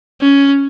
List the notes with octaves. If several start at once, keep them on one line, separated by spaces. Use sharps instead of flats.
C#4